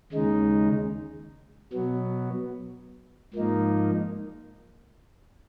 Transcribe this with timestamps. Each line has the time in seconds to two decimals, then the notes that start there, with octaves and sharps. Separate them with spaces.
0.12 D#2 C#3 G#3 D#4
1.73 B2 F#3 B3
3.34 G#2 F3 A#3 D#4